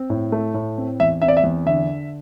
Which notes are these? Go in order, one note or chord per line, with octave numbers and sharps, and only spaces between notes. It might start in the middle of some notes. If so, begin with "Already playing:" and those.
Already playing: C4
A2
A3
A2
C4
E2 E5
C4 E5
D5
E5
E2
D3 E5